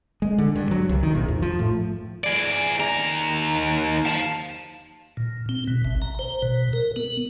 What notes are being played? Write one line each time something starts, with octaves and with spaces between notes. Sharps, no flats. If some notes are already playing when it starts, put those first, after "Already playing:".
G#3
D3
G2
F#3
C2
D#3
A#1
F2
F3
A2
G#4 D5
D#2 A#5
F5 A5
A#2
C4
B2
A1
A#5
C5
B2
A#4
B3